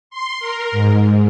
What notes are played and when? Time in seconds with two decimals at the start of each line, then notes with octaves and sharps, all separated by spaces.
0.10 C6
0.39 A#4
0.71 G#2